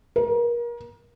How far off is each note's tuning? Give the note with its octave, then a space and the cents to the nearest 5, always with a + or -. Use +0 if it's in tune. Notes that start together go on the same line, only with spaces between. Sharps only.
A#4 +30